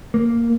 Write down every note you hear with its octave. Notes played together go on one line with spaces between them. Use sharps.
A#3